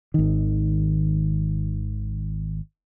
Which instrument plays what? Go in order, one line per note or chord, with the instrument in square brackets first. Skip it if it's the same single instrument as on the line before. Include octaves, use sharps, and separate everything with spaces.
[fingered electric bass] G#1 D#3